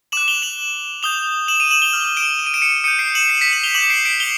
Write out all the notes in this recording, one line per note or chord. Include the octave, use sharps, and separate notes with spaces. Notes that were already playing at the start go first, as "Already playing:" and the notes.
D6 F#6 E7 F#7
F7 G7
E7 F#7
D#6 G6 F7 G7
E7 F#7
D#7 F7
E7 F#7
F7 G7
D6 F6
D7 E7
E7
D#7
D7 E7
C#7 D#7
D#6 G6 C#7 D#7
C7 D7
E7 F#7
C7
B6 C#7
E7 F#7
F7 G7
D6 G6 E7 F#7
C7 D7
C7 D7
F7 G7